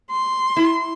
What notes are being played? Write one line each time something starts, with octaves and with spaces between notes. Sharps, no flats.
C6
E4